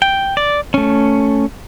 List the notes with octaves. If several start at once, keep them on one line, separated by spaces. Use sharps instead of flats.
G5
D5
A3 C#4